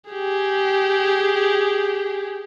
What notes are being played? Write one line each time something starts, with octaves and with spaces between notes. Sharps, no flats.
G4 G#4